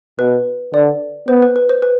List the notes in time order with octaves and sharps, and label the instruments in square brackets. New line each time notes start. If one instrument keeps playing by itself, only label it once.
[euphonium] B2 [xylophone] B4
[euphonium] D3 [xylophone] D5
[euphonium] B3 [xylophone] C5
[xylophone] B4
B4
C5
B4